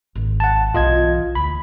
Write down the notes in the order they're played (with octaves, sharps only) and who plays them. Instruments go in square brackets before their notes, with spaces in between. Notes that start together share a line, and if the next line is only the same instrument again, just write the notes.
[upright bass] G#1
[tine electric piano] F#5 A5
[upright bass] B1 E3 [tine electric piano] F4 D#5 G#6
[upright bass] D2 [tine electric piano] B5